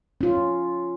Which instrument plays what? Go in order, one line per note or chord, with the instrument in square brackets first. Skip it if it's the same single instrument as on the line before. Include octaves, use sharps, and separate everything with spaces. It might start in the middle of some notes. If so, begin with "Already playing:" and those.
[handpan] C#4 F4